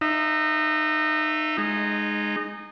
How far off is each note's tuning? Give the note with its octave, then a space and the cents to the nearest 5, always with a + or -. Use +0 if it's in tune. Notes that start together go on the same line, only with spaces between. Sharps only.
D#4 -20 E5 +5
G#3 +0 D#4 -20